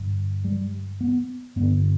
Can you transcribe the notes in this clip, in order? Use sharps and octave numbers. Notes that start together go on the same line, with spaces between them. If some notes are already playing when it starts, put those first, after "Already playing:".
Already playing: G2 D3
G3
B3
G2 D3 B3